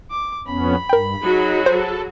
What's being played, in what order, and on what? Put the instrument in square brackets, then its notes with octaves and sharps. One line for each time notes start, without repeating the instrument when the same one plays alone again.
[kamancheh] D6
[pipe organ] F2 B3 C#4 [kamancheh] B5
[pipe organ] G2 [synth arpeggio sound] A#4 G5
[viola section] F#3 F#4 G#4 [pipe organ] D#4
[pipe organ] A4 [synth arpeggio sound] C5